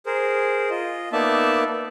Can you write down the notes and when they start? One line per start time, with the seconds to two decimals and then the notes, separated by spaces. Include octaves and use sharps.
0.06 G#4 A#4 C5
0.70 F4 D#5
1.13 A#3 B3 D#4 D5 E5 A5